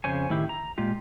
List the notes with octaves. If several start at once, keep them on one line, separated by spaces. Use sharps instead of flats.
F2 C#3 C5 C#5 G#5
A2 D#3 E4 G4
A#5
A#2 G#3 F4 G4